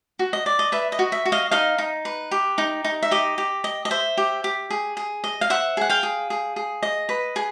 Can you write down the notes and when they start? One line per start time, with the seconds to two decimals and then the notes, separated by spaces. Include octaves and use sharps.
0.19 F#4
0.33 D#5
0.46 D5
0.59 D#5
0.72 B4 E5
0.92 D#5
0.99 F#4
1.12 E5
1.25 F#4
1.32 D#5 F5
1.51 D#4 D#5 F5
1.78 D#4
2.05 B4
2.31 G4
2.58 D#4
2.84 D#4
3.03 E5
3.11 G4 D#5
3.38 G4
3.64 D#5
3.85 D#5
3.91 C5 E5
4.17 G4
4.44 G4
4.70 G#4
4.97 G#4
5.24 D#5
5.41 F5
5.50 C5 E5 F#5
5.77 G#4 F#5
5.90 F5 G5
6.03 G#4
6.30 G#4
6.56 G#4
6.83 D#5
7.09 B4
7.36 G#4